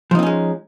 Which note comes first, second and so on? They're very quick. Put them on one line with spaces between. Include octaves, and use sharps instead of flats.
F3 D#4 C4 C#4 G#3